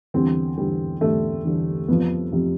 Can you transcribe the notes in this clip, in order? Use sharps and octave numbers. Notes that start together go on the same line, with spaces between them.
E2 D3 G3 C4
E2 D3 G3
E2 D3 G3 A3
E2 D3 G3
F2 C3 F3 B3
F2 C3 F3